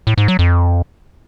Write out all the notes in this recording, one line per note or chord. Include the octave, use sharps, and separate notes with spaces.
A2
G#2
F#3
F2